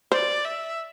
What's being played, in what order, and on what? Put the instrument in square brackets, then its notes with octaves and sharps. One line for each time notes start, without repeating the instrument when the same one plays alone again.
[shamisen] C5 [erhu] D5
[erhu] E5